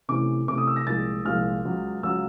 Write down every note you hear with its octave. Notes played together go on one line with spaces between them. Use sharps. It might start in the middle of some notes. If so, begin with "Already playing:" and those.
C3 E3 A3 C#4 D6
C3 E3 A3 C#4 D6
D#6
E6
A#6
C2 A#2 F3 G#3 A6
C2 A#2 F3 G#3 F6
C#2 C#3 F#3
C#2 C#3 F#3 E6